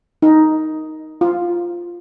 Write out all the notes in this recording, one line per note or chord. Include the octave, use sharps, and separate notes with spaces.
D#4
F4